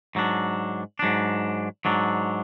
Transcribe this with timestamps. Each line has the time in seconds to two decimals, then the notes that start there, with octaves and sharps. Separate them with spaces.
0.15 G#2 F#3 D4
0.99 G#2 F#3 D4
1.85 G#2 F#3 D4